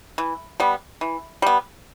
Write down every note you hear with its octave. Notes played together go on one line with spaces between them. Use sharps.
E3
G3 B3
E3
G3 B3